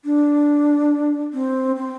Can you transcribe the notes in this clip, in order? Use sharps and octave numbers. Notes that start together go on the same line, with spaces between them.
D4
C4
C4